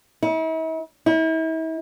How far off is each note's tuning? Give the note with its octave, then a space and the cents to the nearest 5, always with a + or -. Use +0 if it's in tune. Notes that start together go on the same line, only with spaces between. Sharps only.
E4 -45
E4 -40